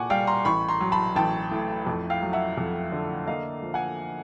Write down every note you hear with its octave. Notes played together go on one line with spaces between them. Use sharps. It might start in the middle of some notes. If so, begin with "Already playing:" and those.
Already playing: A#2 A#3 F#5 G#5 A5 C#6 D6
G3 F5 G5
A#5 C6
A1 B5 C#6
A#5 C6
F#3
A5 B5
A1 G5 A5
A2
F2
F5 G5
F#3
E5 F#5
F2
D3
A#3 D#5 F5
F3
F#5 G#5